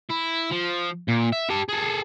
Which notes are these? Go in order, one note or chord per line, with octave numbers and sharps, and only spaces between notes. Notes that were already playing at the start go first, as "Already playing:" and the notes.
E4
F3
A#2
E5
G4 A5
G#4 A4